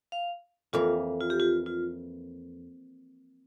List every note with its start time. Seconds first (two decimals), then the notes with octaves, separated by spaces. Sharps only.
0.12 F5
0.73 F2 E3 A#3 F4
1.21 F4
1.30 G4
1.40 F4
1.66 F4